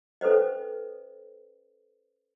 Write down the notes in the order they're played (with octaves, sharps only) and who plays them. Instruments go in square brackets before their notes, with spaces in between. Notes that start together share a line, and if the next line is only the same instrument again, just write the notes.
[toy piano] C#4 A4 B4 C5 D#5